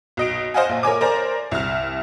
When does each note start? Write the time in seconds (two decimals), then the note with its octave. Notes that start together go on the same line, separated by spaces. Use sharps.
0.17 B1 D#5 D7
0.54 C5 D#5 F5 F#5 G#5
0.69 A#1
0.83 A#4 C#5 G#5 D6
1.01 A#4 C5 D5 A#5
1.51 C2 F6